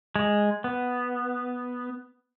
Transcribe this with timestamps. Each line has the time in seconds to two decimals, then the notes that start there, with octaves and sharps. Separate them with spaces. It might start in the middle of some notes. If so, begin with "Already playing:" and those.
0.16 G#3
0.64 B3